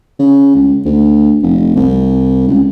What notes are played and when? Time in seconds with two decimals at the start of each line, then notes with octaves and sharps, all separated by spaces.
0.19 C#3
0.55 C#2
0.85 D2
1.42 F1
1.76 C2
2.47 C#2